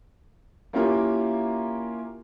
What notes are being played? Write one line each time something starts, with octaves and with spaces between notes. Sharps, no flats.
A#3 C#4 E4 F4 G4 A#4